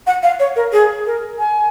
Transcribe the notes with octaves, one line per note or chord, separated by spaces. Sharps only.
F#5
F5
C#5
A#4
G#4
A#4
G#5